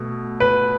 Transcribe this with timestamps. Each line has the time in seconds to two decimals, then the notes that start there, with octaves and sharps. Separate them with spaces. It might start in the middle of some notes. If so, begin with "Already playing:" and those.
Already playing: B2 A3
0.40 B4